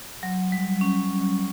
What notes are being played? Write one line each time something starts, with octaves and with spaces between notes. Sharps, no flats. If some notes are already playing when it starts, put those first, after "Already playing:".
F#3
G3
C#4